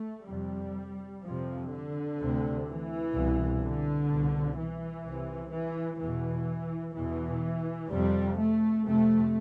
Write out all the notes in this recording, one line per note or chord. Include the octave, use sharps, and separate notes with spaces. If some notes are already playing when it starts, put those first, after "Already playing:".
Already playing: A3
F2 C3 G3
F2 C3 F3
D3
D2 C3
E3
C2 B2
D3
C2 B2
E3
C2 C3
E3
E2 B2 E3
E2 B2 E3
F2 C3 G3
A3
F2 C3 A3